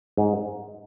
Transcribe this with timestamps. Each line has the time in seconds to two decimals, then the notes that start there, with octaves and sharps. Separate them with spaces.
0.17 G#2